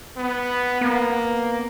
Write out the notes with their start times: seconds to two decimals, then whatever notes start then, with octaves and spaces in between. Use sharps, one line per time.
0.17 B3
0.81 A#3 B3